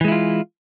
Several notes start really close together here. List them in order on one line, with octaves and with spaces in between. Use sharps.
E3 G#3 E4 F4